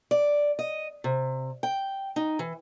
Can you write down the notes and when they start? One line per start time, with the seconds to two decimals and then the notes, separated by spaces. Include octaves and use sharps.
0.11 D5
0.59 D#5
1.04 C3
1.63 G5
2.16 D#4
2.39 E3